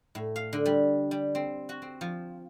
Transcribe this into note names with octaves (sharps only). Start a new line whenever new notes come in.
A2
F5
D3
G3
G3
C4
F#4
C4
F3